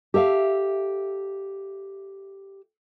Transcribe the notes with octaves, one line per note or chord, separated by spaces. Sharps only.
G4 A4 E5 F5